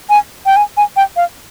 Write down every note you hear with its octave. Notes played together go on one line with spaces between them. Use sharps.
G#5
G5
G#5
G#5
G5
F5